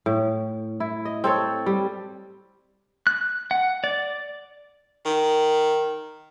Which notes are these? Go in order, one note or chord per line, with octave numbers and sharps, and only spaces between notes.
A2
E4
D#5
C4 A4 C#5
G3
F#6
F#5
D5
D#3